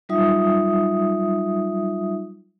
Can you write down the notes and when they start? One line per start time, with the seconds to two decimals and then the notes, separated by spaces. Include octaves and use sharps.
0.09 F#3 G3 D#4 F4 E5 D#6